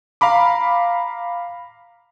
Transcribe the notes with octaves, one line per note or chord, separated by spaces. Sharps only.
F5 A#5 B5 D6